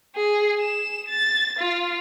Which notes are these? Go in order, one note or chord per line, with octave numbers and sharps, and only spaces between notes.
G#4
E7
A6
F4